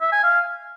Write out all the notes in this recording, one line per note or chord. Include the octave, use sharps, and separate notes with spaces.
E5
G#5
F5